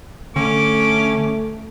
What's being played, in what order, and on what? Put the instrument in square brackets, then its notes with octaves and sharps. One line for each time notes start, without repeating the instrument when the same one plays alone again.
[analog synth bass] D3 [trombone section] A3 [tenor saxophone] C#4 [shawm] D6